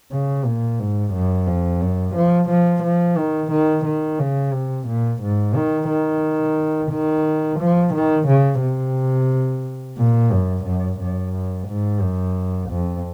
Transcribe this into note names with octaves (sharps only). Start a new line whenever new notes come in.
C#3
A#2
G#2
F#2
F2
F#2
F3
F3
F3
D#3
D#3
D#3
C#3
C3
A#2
G#2
D#3
D#3
D#3
F3
D#3
C#3
C3
A#2
F#2
F#2
F#2
G#2
F#2
F2